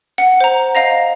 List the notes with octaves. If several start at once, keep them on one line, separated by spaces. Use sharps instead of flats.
F#5
C5 A#5
D#5 F5 A#5 A#6